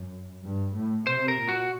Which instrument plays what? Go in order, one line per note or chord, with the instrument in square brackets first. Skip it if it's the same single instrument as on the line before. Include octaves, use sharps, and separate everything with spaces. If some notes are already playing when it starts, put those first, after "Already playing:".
Already playing: [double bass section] F#2
G2
A2
[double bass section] C3 [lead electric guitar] C5
[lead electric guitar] A#4
[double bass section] A#2
[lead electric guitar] F#4